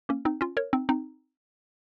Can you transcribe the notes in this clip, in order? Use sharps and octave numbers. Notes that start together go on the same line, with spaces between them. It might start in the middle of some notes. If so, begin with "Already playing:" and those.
A#3 C#4
C4 D#4
C#4 F4
A#4 C#5
C4 D#4
C4 D#4